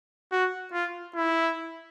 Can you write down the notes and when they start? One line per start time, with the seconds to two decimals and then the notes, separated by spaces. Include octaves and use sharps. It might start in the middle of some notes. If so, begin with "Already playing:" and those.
0.32 F#4
0.73 F4
1.16 E4